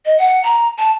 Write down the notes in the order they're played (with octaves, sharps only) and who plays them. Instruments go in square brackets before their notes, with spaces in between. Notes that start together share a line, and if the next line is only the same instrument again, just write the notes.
[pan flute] D#5
F#5
A#5
A5